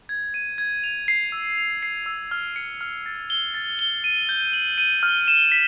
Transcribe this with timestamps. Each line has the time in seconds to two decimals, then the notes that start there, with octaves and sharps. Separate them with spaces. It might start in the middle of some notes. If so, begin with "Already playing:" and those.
0.09 G#6
0.34 D#7
0.58 G#6
0.84 F7
1.08 C7
1.32 E6
1.58 F7
1.83 C7
2.06 E6
2.31 F6
2.56 C#7
2.81 F6
3.06 A6
3.30 G7
3.54 A6
3.79 G7
4.04 D#7
4.29 G6
4.53 F#7
4.78 D#7
5.03 F6
5.28 E7
5.52 B6